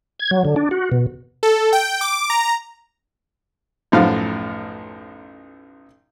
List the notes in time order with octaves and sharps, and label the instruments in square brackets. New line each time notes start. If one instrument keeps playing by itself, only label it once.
[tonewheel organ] G#6
F#3
D3
D4
F#4
B2
[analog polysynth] A4
G5
D6
A#5
[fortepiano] B1 F#2 A2 F3 F5